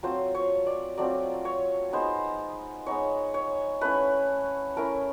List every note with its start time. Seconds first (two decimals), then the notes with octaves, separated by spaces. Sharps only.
0.03 F#3 A3 C4 F4 C5
0.35 C#5
0.66 D5
0.98 F#3 A3 C4 F4 D5
1.45 C#5
1.93 G#3 B3 D#4 C5
2.86 G#3 B3 D#4 C#5
3.34 C#5
3.81 A3 C#4 E4 B4
4.76 A3 C#4 E4 A#4